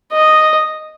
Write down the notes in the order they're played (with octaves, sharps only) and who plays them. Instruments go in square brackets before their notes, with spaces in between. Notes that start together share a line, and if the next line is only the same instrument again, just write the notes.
[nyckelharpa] D#5